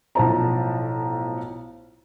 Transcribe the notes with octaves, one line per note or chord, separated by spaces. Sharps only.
B1 A2 F3 C5 A5 A#5